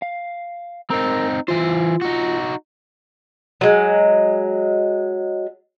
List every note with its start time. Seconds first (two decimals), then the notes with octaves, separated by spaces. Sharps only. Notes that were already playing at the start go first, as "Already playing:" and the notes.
0.02 F5
0.90 C4 D#4 A#4 A#5
1.48 E3 F4 C5
2.01 D#4 F#4
3.61 F#3 G#3